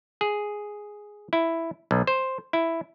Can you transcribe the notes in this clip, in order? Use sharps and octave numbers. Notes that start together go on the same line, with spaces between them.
G#4
E4
B1
C5
E4